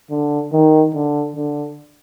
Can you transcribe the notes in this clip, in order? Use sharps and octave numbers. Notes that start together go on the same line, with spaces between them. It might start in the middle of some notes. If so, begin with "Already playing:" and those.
D3
D#3
D3
D3